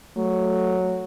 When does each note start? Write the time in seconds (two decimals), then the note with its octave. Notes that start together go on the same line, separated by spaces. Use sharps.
0.17 F#3 A3